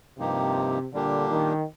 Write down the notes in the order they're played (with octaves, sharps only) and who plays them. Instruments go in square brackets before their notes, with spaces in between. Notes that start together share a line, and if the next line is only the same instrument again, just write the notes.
[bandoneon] G2 F3 A#3 D#4 G4 [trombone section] C3
[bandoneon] A#2 G3 A#3 D4 G4 [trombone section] D3
[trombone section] D#3